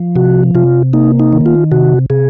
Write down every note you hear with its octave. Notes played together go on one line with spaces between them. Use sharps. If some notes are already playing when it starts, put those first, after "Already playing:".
Already playing: F3
C3 F#4
C3 F4
A#3 D#4
D#4
D#3
F4
C3 F#4
C3 G#4